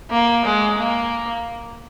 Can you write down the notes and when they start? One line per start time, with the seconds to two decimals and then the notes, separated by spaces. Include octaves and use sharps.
0.11 A#3
0.45 G#3
0.79 A#3